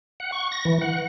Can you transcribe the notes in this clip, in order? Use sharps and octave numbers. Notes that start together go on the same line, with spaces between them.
F#5
C#6
A#6
E3
F#5